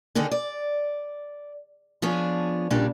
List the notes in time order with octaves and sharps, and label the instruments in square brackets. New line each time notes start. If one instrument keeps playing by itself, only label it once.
[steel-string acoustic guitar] D3 D#3 D4 D#4 G#4
D5
F3 B3 D4 G#4 C#5
A#2 C#3 G3 D4